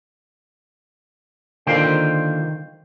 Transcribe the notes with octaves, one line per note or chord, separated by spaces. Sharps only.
D3 D#3 A#3 F4 C5 G5